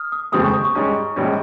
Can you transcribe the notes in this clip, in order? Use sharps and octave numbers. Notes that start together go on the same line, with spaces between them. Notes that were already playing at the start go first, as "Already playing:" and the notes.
Already playing: D#6 F6
D#6
F1 D#2 C#3 G#3 C4 D#6
C#6
D#6
C#6
G#2 G3 C#4
A#1 G#2 G3 C#4